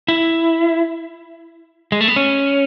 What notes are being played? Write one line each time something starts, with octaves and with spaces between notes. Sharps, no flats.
E4
G#3
A3
B3
C#4